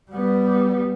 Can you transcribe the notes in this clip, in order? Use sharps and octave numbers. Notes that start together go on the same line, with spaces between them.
G3 B3